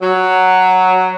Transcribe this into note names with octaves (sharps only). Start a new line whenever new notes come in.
F#3